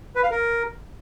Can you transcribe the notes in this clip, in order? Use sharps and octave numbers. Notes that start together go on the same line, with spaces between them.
B4
F5
A#4